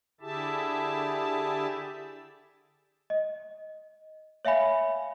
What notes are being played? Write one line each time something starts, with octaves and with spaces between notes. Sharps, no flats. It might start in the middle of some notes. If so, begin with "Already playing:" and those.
D3 E4 G4 G#4 E5 A5
D#5
C#5 E5 F5 G#5 B5